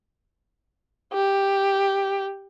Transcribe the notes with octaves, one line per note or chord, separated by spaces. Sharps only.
G4